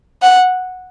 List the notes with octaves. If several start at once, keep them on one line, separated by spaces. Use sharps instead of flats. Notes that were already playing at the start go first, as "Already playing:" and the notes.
F#5